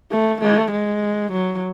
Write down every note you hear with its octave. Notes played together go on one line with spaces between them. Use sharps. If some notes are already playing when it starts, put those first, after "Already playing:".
A3
A3
G#3
F#3